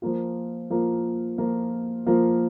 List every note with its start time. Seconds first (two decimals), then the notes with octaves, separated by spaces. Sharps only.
0.02 F3 A#3 F4
0.70 F3 A#3 F4
1.38 F3 A#3 F4
2.06 F3 A#3 F4